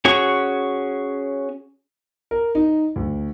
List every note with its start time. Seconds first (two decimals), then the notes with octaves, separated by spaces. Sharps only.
0.05 C#4 F#4 G#4 C#5 C#6
2.31 A#4
2.55 D#4
2.96 D2